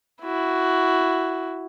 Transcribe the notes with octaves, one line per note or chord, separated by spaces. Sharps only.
E4 F#4